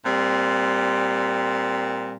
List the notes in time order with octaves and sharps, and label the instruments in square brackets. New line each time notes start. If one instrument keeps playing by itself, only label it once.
[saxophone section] A#2 G3 C4